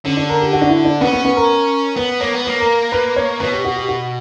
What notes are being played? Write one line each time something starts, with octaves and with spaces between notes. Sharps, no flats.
D3 C#4
D4
A#4
G4
F#4
D4
E4
D4
B3 C#4
B3
B3
A#4
B3 B4
A#3 C#5
B3
A#3 B4
A#4
B4
C#5
B2 B4
G4
F#4
G4
F#4